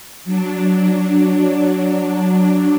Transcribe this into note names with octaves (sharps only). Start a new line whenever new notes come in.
F#3 D4